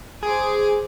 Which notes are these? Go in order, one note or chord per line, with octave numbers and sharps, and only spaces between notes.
G#4 C5 G#5 D6